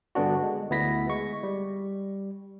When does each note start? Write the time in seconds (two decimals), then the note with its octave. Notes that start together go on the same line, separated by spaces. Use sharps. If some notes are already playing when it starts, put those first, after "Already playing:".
0.15 G2 D3 B3 D4 F#4
0.43 G#3
0.70 D2 B3 E4 A#6 B6
1.09 G#3 C#6
1.43 G3